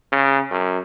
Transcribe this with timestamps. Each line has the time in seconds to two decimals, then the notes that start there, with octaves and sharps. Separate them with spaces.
0.12 C#3
0.51 F#2